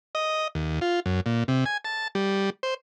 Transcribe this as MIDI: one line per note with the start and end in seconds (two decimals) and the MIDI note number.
0.15 0.48 75
0.55 0.79 39
0.81 1.00 65
1.06 1.21 42
1.26 1.44 46
1.48 1.65 48
1.66 1.77 80
1.85 2.08 81
2.15 2.50 55
2.63 2.74 72